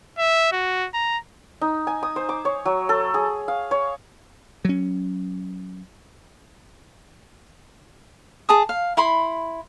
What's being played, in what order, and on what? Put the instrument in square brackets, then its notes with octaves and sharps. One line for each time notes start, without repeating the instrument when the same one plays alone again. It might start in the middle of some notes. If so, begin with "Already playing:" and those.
[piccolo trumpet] E5
F#4
A#5
[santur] D#4
G#5
D#6
C5
D6
C#5
F#3
A4
G#4
F5
C#5
[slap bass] F#3 C#4
[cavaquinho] G#4 A5 D#6
F5
E4 B5 C6